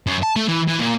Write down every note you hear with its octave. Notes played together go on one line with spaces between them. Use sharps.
F#2
A5
A3
E3
E3
A#2